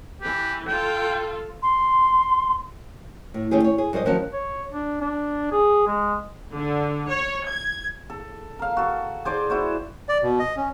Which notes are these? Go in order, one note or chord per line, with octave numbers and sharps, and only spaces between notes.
E3 G4 B4
F4 A4 G5
C6
A2
D#3 A3 C#4 G4 G#4
C#5
G#4
F#2 G3 C5 D#5
D#3 F3 F#3 C#4 F#4 A5
C#5
D4
D4
G#4
G#3
D3
C#5
G#6
A4
A#4 F5
F#4 A4
G#4 C5 D5 D6
E4 F#4 C5
D5
B2
D#5
C#4